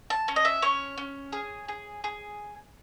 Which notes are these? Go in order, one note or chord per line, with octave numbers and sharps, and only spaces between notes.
A5
C#4
D#5
E5
C#4 C#5
C#4
G#4
G#4
G#4